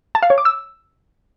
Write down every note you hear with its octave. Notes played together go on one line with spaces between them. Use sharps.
A5
F5
C#5
D6
E6